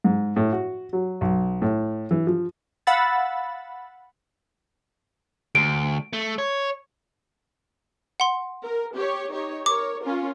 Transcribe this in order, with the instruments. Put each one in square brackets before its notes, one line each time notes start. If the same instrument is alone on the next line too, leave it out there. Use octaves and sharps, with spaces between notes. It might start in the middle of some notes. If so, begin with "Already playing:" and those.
[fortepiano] G#2
A2
F#4
F#3
B1
A2
E3
F3
[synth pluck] F5 F#5 B5 E6 A6
[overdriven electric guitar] D2 [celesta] D7
[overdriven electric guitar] A3
C#5
[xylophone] F#5 C6
[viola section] A#4
G4 C#5
D#4 G4 C#5
[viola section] A#4 C#5 [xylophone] D6
[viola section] C#4 F4 A#4